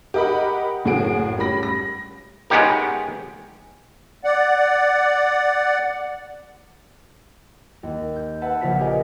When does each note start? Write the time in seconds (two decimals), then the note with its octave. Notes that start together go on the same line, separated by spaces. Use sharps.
0.14 G4 A#4 D#5 F#5 B5
0.85 F#1 A2 F#4 G#4 D7
1.38 G3 C#4 B5 A#6
1.63 A#6
2.50 G#3 B3 C#4 D#4 G4 A#4
4.24 D5 F#5
7.83 D#2
8.16 G6
8.41 B4 E5 F#5 A5
8.61 A#1 C#3 F4 C5 B6
8.79 G4 G#4 A#4 D#5 G#5